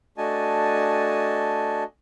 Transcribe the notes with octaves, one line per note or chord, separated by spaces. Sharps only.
A3 D4 F#4 D#5 G#5 A5